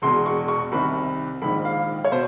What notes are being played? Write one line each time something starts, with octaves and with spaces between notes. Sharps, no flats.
E1 E2 B2 C6
C#6
C#6
C2 C3 D#3 B5
A#1 G#2 D#3 B5
F5
C#5
B2 C5